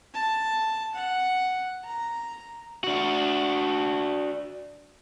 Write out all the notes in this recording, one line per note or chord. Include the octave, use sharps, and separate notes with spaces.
A5
F#5
A#5
D4 F#4